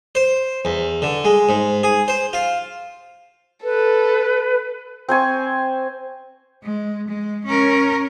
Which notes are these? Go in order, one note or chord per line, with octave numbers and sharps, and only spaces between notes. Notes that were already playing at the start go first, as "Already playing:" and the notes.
C5
E2
D3
G#3
G#2
G#4
C5
F4
A4 B4
C4 C5 G#5 C#6
G#3
G#3
C#4 A#4